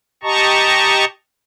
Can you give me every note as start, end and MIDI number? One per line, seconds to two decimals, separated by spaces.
0.23 1.05 67
0.23 1.05 75
0.23 1.05 81
0.23 1.05 82
0.23 1.05 85